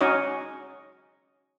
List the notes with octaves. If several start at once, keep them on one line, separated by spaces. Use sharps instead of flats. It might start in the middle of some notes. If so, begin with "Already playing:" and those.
C#4 D#4 F#4 C#5 D#5